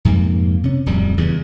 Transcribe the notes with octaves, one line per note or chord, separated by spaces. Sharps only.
F2 G#2 C3 A#3
C3 C#4
D1 F2 G3
E2 G2 C#3